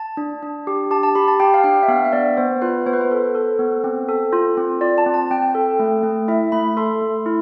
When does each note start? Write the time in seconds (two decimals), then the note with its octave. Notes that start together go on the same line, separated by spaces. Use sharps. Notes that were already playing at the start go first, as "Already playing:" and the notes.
Already playing: A5
0.17 D4
0.43 D4
0.67 G4
0.91 G4 A5
1.03 A5
1.15 G4 B5
1.28 A5
1.40 G4 G5
1.54 F5
1.64 D4 G5
1.83 E5
1.88 B3 F5
2.05 E5
2.13 B3 D5
2.37 B3 C5
2.62 F4 B4
2.86 B3 C5
2.93 B4
3.01 C5
3.11 A4
3.35 A4
3.59 B3
3.84 C4
4.09 A4
4.33 F4
4.57 C4
4.81 F4 D5
4.98 A5
5.06 C4
5.14 A5
5.31 C4 G5
5.55 A4
5.79 A3
6.03 A3
6.28 E4 E5
6.52 A3 B5
6.77 A4 C6
7.02 A3
7.26 E4